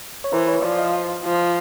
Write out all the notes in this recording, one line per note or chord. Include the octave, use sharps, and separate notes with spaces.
C#5
E3 A#4 C5
B4 C#5
F3 C5 D5
D#5 F5
F3